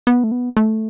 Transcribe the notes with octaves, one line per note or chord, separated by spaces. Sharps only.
B3
A3
B3
A3